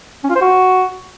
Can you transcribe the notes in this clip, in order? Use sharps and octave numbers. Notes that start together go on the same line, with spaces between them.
C#4
F4
C5
F#4